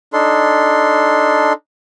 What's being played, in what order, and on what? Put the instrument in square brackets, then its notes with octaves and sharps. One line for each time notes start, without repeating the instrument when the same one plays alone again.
[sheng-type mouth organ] D4 D#4 A4 C6